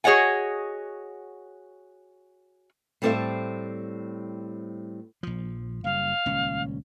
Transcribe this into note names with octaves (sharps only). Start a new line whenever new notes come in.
F#4 G#4 C#5 D#5 F#5 G#5
A2 G3 C4 A4 C5 E5
A#1 F3
F#1 G3 F5
D#1 C#2 C#4